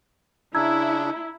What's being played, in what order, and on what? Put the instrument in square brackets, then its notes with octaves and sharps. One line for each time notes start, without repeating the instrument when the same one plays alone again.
[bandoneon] C#3 D4 [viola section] E4 [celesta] A#5 E6 G#6